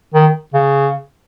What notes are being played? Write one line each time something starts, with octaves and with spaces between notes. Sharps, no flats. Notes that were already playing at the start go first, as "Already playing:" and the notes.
D#3
C#3